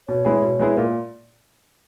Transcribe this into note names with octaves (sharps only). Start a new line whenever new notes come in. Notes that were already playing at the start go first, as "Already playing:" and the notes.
B2 C#5
G#3 B3 E4 G#4
B2
G#3 B3 E4 G#4
A#2 A#4